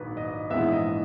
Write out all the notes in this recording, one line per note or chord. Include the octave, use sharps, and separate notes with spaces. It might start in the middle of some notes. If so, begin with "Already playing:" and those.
Already playing: A#1 G#2 D#3 F#3 B4
D#5
A#1 G#2 E3 G#3 B3 E5
D#5